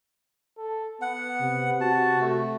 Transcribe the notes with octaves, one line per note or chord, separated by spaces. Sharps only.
A4
B3 F#5
C3
F#4 A5
A3